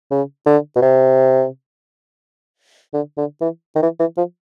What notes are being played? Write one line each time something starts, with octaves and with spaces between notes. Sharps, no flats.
C#3
D3
B2
C3
D3
D3
E3
D#3
E3
E3
F3